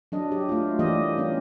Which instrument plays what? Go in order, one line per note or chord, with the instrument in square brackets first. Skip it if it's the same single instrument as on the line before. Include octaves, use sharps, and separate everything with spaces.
[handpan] F#3 D4 D#5
G4
A3 F4
E3 G3 A#3 G4 D#5
B3 C#4 F4